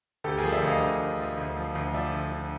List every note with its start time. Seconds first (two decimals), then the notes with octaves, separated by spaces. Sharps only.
0.24 D2 G4 A4
0.38 G#4 A#4
0.43 F3
0.52 D5 E5
0.62 D2 D#5 F5
0.80 D2
0.99 D2
1.19 F3
1.37 D2
1.57 F3
1.75 D2
1.94 F3 D5 E5
2.12 D3
2.32 D3